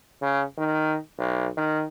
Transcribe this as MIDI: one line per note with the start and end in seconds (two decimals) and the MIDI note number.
0.21 0.43 49
0.58 0.96 51
1.18 1.48 35
1.57 1.85 51